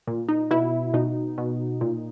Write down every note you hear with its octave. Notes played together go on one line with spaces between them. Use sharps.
A#2
D#4
B2 E4
B2 D#4
B2
A#2